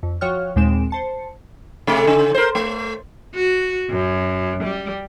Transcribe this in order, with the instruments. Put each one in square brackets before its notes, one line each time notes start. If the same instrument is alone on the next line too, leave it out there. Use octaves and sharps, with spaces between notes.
[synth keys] F2
F3 F#4 C#5 G5 C#6 F6
D#2 A#2 G#3 C4 D7 E7
C5 A5 C#7
[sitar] C3 A3
C#3
A#4 C5
A3
[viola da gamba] F#4
F#2
G3